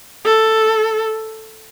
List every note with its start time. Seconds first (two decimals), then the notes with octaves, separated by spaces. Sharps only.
0.25 A4